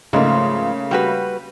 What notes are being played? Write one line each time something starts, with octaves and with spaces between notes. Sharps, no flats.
G#2 C#3 F3 A3 A#3
G3 F#4 B4